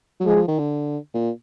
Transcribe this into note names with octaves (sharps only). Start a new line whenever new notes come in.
F#3
F3 G#3
F3
D#3
D3
A#2